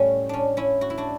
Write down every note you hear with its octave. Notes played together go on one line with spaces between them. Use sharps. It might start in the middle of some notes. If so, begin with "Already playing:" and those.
Already playing: A2 G3 C#4
C#4 D4
C#4 E4
F#4
E4
D4 F#4